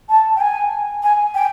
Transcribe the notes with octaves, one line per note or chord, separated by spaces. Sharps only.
A5
G5
G#5
G#5
G5